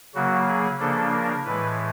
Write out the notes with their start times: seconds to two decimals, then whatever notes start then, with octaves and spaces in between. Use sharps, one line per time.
0.15 C#3 F#3 A#3 F#4
0.47 G#4
0.80 C#3 F3 A#3 D4 A4
1.12 A#4
1.44 A2 E3 G#3 B4